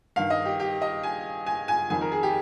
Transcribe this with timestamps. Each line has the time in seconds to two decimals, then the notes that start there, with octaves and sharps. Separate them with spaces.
0.16 G2 D#3 F5
0.30 D#5
0.45 G4
0.60 G4
0.82 D#5
1.03 G#5
1.46 G#5
1.68 G#5
1.90 F2 D#3 G#5
2.01 A#4
2.12 G#4
2.23 G4